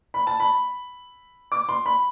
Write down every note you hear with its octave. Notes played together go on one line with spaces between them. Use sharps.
B5
A5
B5
D6
C6
B5